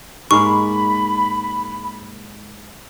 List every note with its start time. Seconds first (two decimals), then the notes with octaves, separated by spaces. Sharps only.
0.31 G#2 G#3 A#3 B5 C#6